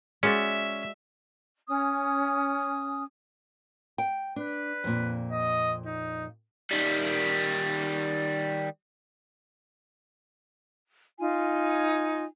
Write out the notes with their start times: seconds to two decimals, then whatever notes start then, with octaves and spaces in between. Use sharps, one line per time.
0.23 G#3 C#4 F#4 D5 E5
1.68 C#4 D#6
3.98 G5
4.36 D4 B4
4.84 F2 A#2
5.32 D#5
5.86 D#4
6.71 D#3 G3
11.18 D#4 F4 G#5